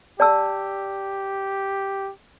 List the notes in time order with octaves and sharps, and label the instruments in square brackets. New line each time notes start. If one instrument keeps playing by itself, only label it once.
[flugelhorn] G4 [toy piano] D5 A5 E6